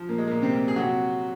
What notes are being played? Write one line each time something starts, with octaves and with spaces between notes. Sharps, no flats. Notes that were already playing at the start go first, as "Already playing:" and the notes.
Already playing: F3
A#2 A#3
G#3
A#2 A#3
C3 C4
A#2
G#4
C3 F#3 F#4